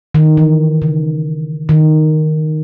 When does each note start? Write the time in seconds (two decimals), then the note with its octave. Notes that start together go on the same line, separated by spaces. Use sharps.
0.15 D#3
0.37 E3
0.82 C#3
1.69 D#3